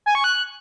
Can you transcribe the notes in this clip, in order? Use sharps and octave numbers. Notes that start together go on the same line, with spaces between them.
G#5
C#6
F#6